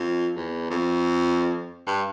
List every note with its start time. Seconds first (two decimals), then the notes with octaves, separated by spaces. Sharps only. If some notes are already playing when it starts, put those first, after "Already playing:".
Already playing: F2
0.36 E2
0.70 F2
1.87 G2